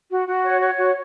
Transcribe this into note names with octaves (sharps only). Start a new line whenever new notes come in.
F#4
F#4
C#5
C#5
F#4